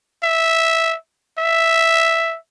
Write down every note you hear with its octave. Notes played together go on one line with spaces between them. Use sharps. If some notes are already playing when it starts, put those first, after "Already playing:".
E5
E5